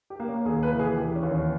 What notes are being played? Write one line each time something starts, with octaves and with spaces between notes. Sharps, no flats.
G4
A#3
C#4
D#2 G#4
B4
E3
G#4
E3 G4
C#4
D#2
C#4